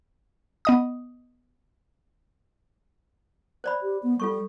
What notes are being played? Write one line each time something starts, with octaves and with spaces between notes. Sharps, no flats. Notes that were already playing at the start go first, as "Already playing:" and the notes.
B3 D#5 D#6
C5 D5 B5
G4
B3
G3 F4 A4 C#6